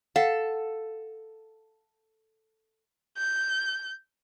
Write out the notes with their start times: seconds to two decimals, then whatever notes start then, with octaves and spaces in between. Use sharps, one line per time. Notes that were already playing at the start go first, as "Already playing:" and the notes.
0.16 A4 F5 F#5
3.17 G6